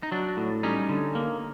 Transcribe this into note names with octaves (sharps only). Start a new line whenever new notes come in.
D#4
F#3 D4
A2
G3 C#4 D#4
D3
A#3